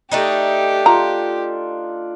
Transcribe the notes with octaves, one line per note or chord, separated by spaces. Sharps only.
A3 D4 D#4 G4
F4 A#5